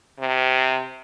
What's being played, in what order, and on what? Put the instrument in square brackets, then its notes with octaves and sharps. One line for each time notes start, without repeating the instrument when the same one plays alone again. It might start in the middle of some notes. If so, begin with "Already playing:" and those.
[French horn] C3